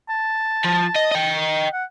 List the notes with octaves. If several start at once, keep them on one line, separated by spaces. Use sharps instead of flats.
A5
F3
D#5
D#5 G5
F#5